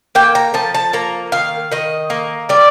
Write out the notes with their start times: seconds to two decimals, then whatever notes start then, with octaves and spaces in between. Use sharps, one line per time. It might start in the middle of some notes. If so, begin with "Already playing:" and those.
0.15 A#3 G5
0.35 A#5
0.54 F3 A5
0.74 A5
0.93 A#3 A#5
1.32 D#3 F5
1.72 D#3 D#5
2.10 A#3
2.49 G3 D5